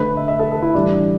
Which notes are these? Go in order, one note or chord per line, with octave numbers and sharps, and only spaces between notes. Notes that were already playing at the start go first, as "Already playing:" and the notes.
Already playing: D3 A3 B4
E5
E5
A4
A4
E4
A2 E3 G3 D4